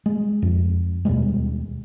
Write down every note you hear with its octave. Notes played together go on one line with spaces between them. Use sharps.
G#3
F2
D#2 B2 G3 G#3